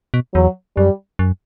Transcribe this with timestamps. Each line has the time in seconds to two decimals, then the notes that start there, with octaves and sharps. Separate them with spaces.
0.14 B2
0.34 E2 F#3
0.77 F#2 G3
1.19 F#2